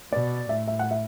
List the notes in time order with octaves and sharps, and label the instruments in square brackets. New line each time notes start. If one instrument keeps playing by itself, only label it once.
[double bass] B2 [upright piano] D5
[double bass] A2 [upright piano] E5
[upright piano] E5
F#5
E5